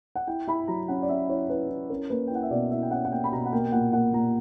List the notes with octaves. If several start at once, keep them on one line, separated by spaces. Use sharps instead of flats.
F#5
E4 G5
E4 B5
F#3 A#5
C#4 F#5
D5
C#4 E5
E4 C#5
E4 B4
E4
C#4 A#4
A#3 B4
G5
E4 F#5
E5
B2 D5
E4 E5
G5
C#4 F#5
F#5
A#3 G5
B5
B2 A#5
F#5
A#3 G5
G5
A#2 F#5
A#3 F#5
A#2 A#5